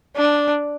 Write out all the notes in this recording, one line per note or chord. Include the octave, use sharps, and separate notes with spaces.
D4